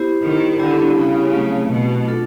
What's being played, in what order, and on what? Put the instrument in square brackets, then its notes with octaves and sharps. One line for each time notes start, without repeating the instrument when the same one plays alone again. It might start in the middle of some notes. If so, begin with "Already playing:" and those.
Already playing: [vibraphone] B3 E4 G4 C5
[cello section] D#3
[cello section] D3 [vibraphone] G3 B3 E4 G4
[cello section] C#3
[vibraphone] F#3 A3 C4
[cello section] B2
[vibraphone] D4 F4 A4